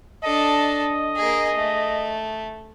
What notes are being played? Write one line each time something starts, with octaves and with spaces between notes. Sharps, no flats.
D4 A4 D#5
A#3 G#4
A3